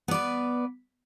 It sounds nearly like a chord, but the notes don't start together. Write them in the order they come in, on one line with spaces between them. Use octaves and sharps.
B3 D5 B4